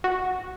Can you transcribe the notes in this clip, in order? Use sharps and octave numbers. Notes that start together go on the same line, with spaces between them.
F#4